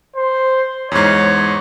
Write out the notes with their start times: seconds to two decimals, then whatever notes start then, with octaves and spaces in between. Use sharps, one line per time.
0.16 C5
0.92 E2 G#2 C#5